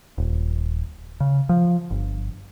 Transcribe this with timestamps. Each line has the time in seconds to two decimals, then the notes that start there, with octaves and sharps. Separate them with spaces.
0.18 D#1
1.20 C#3
1.49 F3
1.91 G1